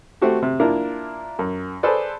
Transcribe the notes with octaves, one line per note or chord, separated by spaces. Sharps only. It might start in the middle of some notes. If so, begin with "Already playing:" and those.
A3 C4 F#4 G4
C3
A#3 D4 E4 F4 A#4
F#2
G#4 A4 B4 C5 D5